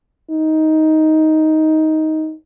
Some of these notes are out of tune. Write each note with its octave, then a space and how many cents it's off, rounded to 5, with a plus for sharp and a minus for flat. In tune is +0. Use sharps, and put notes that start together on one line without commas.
D#4 +10